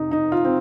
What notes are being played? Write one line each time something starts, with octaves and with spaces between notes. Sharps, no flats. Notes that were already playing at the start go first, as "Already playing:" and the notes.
Already playing: F2 C3 D#4
D#4
F4
C4